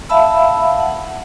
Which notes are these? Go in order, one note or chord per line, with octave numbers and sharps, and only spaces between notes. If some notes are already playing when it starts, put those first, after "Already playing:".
E5 F5 A5 B5 E6
F#5